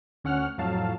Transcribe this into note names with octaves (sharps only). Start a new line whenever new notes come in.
D2 C#4 F#5 F6
F2 A2 F#3 F5 A5